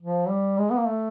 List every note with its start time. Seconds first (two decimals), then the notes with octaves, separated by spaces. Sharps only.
0.02 F3
0.29 G3
0.58 G#3
0.71 B3
0.78 A#3
0.87 A3